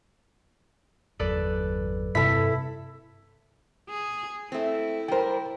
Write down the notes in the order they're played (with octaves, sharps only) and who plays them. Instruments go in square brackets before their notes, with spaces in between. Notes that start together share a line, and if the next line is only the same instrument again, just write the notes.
[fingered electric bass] G1 E2 F#3 [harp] A4 B4 D5
[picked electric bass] G2 C3 [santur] E4 A4 [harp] B6
[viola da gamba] G#4
[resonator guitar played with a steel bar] A3 C4 [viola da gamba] E4
[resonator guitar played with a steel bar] G3 A#4 [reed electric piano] C5 G5